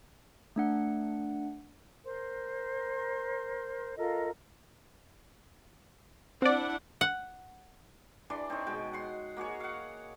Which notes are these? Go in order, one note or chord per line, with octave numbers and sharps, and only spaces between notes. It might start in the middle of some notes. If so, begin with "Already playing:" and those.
A3 D4 F#5
A#4 C5 C6
F4 A4 A#4 D#5
C4 D4 E4 D5 F#5
F#5
E3 D4 D5 C6
C4 D#4 C#5
B2 G#3 G5
F#5 C6
A#3 F#4 G#4 C#5
F5 F#5